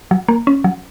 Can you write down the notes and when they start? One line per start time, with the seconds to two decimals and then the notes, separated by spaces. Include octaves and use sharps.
0.11 F#3
0.28 A#3
0.47 C#4
0.64 F#3